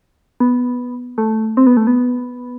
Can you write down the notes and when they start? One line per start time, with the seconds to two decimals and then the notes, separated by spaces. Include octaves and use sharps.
0.40 B3
1.18 A3
1.57 C4
1.67 B3
1.77 A3
1.87 B3